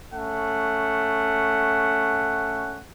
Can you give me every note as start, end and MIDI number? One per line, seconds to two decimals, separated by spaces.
0.13 2.81 57
0.13 2.81 61
0.13 2.81 78